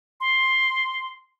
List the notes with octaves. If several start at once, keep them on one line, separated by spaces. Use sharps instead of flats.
C6